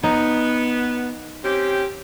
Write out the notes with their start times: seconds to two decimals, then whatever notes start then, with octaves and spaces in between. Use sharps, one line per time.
0.04 B3 D#4
1.44 C4 C#4 G4